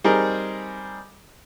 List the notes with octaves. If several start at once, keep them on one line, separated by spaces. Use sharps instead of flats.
G3 C4 D#4 G#4 A#4